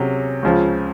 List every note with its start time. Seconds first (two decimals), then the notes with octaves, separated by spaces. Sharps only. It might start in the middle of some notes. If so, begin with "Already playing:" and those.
Already playing: C3 F#3 C#4 G#4
0.43 C#2 C#3 F3